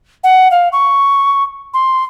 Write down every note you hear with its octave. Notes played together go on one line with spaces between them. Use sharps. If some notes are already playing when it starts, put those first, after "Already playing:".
F#5
F5
C#6
C6